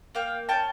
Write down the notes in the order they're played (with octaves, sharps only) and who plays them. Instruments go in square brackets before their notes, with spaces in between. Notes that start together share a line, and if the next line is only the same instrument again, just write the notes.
[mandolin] A#3 F5 G5
C#4 G5 A5